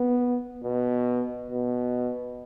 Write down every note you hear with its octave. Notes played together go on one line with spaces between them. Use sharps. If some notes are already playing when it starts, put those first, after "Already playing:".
Already playing: B3
B2
B2